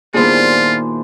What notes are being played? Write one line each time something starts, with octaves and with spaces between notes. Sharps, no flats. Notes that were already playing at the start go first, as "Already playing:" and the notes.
A#2 D#3 B3 D4 E4 F4 G#4 C5